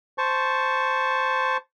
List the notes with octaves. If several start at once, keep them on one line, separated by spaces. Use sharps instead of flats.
C5 A5 C#6